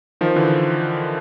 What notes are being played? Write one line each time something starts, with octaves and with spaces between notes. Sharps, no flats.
D#3 F3
D3 E3